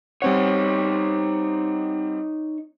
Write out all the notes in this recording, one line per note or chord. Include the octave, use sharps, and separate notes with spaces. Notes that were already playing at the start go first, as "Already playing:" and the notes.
G3 C4 D#4 C#5 F#5